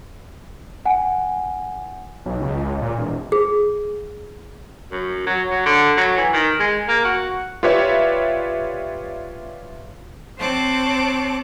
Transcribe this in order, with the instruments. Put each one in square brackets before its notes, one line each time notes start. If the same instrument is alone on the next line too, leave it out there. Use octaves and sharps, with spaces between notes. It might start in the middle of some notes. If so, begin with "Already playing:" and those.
[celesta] F#5 G#5
[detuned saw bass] B1
C#2
A#2
E1
[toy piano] G#4
[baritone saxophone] F#2
F#3
F#3
D3
F#3
E3
D#3
G#3
A#3
F#4
[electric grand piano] F4 G4 B4 C#5 D5 E5
[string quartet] C4 C5 C#5 A5 D6 F#6